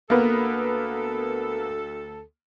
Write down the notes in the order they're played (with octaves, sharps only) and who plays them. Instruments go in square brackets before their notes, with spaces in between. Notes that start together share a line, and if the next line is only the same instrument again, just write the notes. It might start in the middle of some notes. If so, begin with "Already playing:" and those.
[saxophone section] D2 A4 [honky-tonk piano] A#3 B3